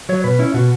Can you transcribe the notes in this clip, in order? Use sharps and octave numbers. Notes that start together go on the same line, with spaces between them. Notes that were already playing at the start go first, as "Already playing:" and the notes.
F#3 C#5
B2 B4
C#4 E4
B2 F#4